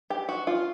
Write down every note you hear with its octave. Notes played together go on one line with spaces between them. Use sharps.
G4
F#4
F4